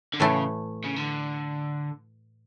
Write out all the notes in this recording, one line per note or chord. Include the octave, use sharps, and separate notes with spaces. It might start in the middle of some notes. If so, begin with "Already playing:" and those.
D3
A2 C#3 E3 A3
C#3
D3